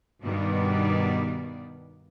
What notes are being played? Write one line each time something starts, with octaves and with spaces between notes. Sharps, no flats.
G2 B2 D#3 G3 B3 D5